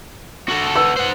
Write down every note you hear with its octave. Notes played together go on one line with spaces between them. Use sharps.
F#4 A4
B4 E6
C5 F#5